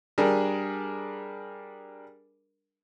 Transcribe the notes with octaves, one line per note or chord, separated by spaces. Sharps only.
G3 D4 G#4 A#4